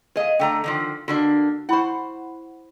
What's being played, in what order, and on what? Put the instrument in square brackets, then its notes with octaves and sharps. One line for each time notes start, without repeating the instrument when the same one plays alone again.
[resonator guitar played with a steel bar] G#4 D#5 [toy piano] B4 F5
[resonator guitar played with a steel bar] D3 A3 A#5 [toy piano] G5
[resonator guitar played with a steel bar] D3 D#3 F3
[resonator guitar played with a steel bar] D3 A#3 D4 [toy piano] F#4
[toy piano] E4 B5 C#6 [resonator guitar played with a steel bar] C5 F#5